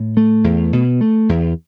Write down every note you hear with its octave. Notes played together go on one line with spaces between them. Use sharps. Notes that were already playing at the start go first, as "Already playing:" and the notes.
Already playing: A2
A3
E2
B2
A3
E2